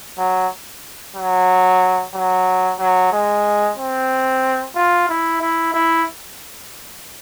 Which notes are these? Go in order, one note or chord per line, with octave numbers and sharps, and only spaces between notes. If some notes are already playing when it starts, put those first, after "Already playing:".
F#3
F#3
F#3
F#3
G#3
C4
F4
E4
E4
E4